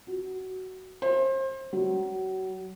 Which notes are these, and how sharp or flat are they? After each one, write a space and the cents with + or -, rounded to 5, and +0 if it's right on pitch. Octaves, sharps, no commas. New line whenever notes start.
F#4 +15
C5 +30
F#3 +30